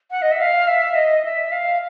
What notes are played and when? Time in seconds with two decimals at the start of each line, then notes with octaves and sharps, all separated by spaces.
0.11 F#5
0.22 D#5
0.32 E5
0.40 F5
0.67 E5
0.95 D#5
1.25 E5
1.52 F5